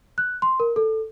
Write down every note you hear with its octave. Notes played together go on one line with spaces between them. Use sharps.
F#6
C6
A#4
A4